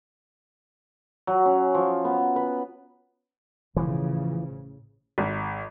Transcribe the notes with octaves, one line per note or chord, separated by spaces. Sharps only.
F#3
C#4
F3
B3
B4
A1 C#3 E3 F3
G#1